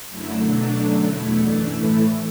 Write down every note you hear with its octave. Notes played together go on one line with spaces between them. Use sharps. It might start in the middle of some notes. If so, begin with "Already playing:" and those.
F#2 D3 F#3 A3 E4
B2 F#3 A3 D4
F#2 D3 F#3 A3
E2 B2 A3 E4
F#2 E3 A3 D4
A2 E3 A3 E4